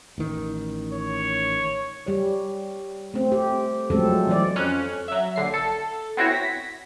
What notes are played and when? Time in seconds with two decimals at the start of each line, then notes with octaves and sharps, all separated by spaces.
0.18 A1 D#3
0.93 C#5
2.06 G3 C#5
3.14 A3 C4
3.32 G4
3.90 F3 F#3 G#3 A3 C4 A4
4.27 E3 F#3 D5
4.56 F2 C#4 F#6
5.08 F#3 E5
5.36 A#1 D3 C7
5.54 A4
6.17 B3 C4 E4 F#4 C#5
6.31 A#6 B6